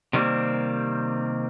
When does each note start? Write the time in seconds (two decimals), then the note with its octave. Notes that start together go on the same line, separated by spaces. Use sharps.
0.13 C3 D#3 G3 A3 A#3 C4